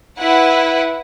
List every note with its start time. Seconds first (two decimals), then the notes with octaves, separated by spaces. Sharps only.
0.18 E4 B4 F#5